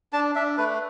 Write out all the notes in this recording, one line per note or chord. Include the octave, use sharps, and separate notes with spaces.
D4 A5
D4 E5
A3 B4